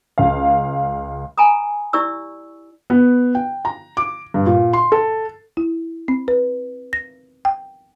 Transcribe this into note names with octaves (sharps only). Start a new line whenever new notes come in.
C#2 F5
G#5 A#5 B5 D#6
E4 G4 D5 C#6 E6
B3
G5
A#5
D6
G2
A#2
C6
A4
E4
C4
B4
A#6
G5